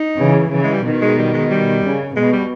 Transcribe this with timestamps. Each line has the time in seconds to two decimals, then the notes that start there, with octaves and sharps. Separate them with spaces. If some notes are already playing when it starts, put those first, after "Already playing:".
Already playing: D#4
0.19 C#3 E3
0.52 C#3 E3
0.63 G#3
0.73 G3
0.84 B2 D#3
1.02 G#3
1.18 G3
1.34 G#3
1.51 G3
1.84 C#3
2.15 B2 G#3
2.32 G3